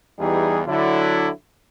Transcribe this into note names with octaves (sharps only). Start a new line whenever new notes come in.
E2 E3 G3 D#4 G4 G#4
D3 F#3 E4